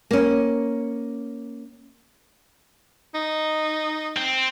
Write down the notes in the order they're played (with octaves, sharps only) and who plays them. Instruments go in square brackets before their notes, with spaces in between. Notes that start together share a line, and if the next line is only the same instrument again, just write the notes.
[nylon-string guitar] A#3 C#4
[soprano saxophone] D#4
[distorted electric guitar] C4